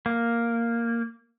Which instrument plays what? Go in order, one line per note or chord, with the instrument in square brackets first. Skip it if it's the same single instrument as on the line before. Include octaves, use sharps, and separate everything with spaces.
[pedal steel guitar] A#3